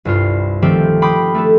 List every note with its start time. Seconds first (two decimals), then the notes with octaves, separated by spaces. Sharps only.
0.05 C2 G2 F4 C7
0.62 D#3 F3 A3 C4 G4
1.02 G5 B5 C6 D6 D#6 G6
1.34 A3 D4 A4